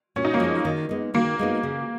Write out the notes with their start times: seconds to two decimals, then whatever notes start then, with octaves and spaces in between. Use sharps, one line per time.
0.16 A#2 C#4
0.25 D#4
0.33 A#3 C#4
0.40 F3 G#3 D#4
0.65 D#3
0.89 G#3 B3 D#4
1.14 D#3 A#3
1.39 G#3 B3 D#4
1.63 C#3